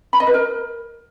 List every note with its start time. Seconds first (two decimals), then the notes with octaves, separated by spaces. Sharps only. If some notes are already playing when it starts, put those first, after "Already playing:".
0.13 B5
0.20 D#5
0.27 B4
0.34 A#4